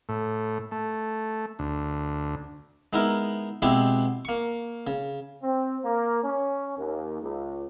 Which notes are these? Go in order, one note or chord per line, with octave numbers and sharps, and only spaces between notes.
A2
A3
D2
G#3 B3 D#4 E4 A#4
B2 G#3 B3 C4 E4 G4
A#3 C#6
C#3
C4
A#3
C#4
D#2
C#2